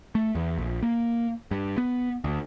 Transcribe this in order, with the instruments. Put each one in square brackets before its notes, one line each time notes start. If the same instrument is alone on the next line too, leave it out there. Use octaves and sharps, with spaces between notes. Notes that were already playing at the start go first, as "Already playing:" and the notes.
[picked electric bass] A3
E2
A#1
A#3
G2
B3
D2